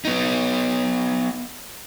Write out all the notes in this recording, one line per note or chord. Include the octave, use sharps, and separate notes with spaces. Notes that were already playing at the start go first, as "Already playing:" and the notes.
B3 D#4